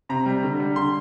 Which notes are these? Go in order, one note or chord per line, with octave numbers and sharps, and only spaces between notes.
C3 A#5
G3
D3
G3
D3 C6